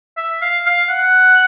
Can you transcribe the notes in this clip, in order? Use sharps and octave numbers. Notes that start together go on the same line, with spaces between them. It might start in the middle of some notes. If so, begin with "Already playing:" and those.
E5
F5
F5
F#5